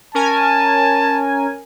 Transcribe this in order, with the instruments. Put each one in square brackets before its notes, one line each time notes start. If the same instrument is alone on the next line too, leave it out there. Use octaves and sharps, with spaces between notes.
[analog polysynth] C#4 A#4 G#5 [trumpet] A5